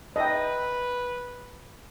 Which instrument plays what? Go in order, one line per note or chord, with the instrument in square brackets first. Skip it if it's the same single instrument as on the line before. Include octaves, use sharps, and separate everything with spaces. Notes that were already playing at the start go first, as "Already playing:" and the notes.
[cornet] B4 [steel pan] D#5 E5 G5